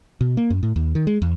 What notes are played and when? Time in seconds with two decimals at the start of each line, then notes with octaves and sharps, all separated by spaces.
0.21 B2
0.37 A#3
0.50 F#2
0.63 A2
0.76 D#2
0.95 D#3
1.07 G#3
1.22 E2